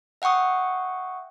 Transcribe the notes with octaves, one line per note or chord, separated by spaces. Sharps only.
E5 F#5 G5 C#6 D#6